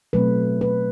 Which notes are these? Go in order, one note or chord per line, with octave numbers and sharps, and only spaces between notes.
B2 F#3 A3 C4 B4
B4